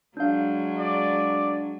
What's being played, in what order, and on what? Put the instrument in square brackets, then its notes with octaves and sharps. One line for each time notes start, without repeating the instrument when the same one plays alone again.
[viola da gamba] F#3 G#3 [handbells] D4 F5
[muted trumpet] D5